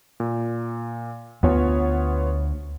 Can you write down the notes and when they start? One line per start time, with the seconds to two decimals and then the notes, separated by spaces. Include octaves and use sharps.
0.20 A#2
1.43 D2 B3 F4 C#5